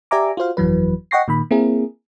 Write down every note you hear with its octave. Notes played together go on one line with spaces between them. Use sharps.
G4 D5 E5 G#5 A#5 D6
F4 F#4 C5 F5
G1 F2 E3 F#3 B4
D#5 F#5 G5 C#6 A#6 C7
A#2 D#3 B5
A#3 C4 E4 G#4 A#4